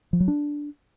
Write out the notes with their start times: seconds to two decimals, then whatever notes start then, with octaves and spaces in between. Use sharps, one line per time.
0.13 F3
0.20 F#3
0.28 D4